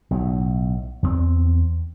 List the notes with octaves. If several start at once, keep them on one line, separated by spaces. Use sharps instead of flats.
B1 A2
E2 A3 C4